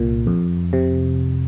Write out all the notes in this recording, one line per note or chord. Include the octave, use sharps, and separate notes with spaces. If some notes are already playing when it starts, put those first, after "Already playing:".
Already playing: C2 A#2
F2
C3